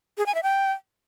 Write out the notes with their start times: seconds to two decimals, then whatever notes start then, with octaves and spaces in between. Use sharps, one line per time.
0.18 G#4
0.26 G#5
0.35 E5
0.43 G5